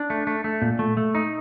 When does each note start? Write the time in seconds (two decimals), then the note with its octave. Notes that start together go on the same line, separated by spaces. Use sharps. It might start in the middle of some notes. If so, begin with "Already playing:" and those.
Already playing: D4
0.10 A3
0.27 A3
0.44 A3
0.62 A#2
0.79 A3
0.97 A3
1.15 D#4